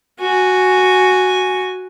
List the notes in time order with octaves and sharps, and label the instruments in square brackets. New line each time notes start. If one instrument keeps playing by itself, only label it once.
[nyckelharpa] F#4 G#5